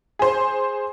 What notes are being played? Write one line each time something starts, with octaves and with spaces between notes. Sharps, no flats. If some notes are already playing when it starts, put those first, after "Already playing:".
G#4 C5